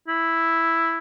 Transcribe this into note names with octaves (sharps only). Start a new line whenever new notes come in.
E4